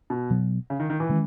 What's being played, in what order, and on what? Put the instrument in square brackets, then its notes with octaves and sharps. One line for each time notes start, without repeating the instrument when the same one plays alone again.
[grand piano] B2
[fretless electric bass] B2 F#3 B3
[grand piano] C#3
D#3
D#3
E3
[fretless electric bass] D#3 G#3 C#4